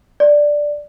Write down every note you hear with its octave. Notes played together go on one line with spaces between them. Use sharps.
D5